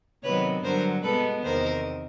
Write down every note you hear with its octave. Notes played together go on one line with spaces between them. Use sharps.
C3 D#3 F#3 B3 B4 C#5
G2 D3 F#3 A#4 C5
B2 G#3 B3 A4 B4
E2 C3 D#3 A#4 C5